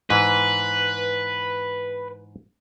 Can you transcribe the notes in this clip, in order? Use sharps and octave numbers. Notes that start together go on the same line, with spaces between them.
G#2 E3 B4